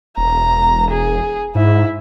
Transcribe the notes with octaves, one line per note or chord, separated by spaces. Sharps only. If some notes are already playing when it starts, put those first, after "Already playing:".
E1 A#5
G#4
G#2 E4